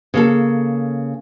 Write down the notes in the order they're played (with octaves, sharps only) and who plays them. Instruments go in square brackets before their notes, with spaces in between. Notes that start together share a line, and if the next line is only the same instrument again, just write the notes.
[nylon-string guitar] C#3 A#3 A4